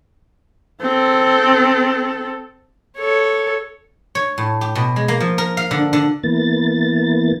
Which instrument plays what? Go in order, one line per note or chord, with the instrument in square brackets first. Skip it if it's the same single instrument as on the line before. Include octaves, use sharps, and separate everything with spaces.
[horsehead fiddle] C4 A4
[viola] A4 C#5
[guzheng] C#5
A2
G4
B2
G#3
A#3
F3
A#4
F5
D3
D3
[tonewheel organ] E3 A#3 B3 A6